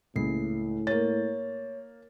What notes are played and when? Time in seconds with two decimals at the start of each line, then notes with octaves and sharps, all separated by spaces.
0.16 C#2 A2 A#3 C7
0.87 A#3 C#5 A6